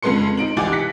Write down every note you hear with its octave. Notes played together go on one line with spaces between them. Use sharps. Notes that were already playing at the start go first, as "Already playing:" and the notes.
F2 C#3 G#3 B4 C6 C#7
D#4 D7 F#7
C2 E3 G4 G#5 D6 A6
F#6 A#6 B6 C#7